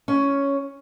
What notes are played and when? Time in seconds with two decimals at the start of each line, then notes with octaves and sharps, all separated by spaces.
0.08 C#4